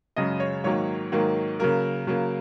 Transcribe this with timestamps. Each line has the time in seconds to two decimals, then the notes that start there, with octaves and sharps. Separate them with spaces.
0.16 F#2 C#3 G#3 D#5
0.40 C#5
0.64 G#2 D#3 F#3 A#3 C#5
1.12 G#2 D#3 F#3 A#3
1.59 C#3 F#3 A#3 A#4
2.07 C#3 F#3 A#3